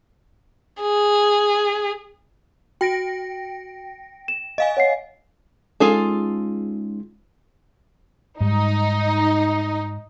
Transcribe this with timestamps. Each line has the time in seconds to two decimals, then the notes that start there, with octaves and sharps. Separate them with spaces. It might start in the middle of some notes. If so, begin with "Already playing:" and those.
0.81 G#4
2.81 F#4 G5 A#6 D7
4.28 E7
4.58 D#5 F5 G#5
4.77 C#5 F#5 C7
5.80 G#3 C#4 D#4 F4 G#4 A4
8.41 G#2 G3 D#4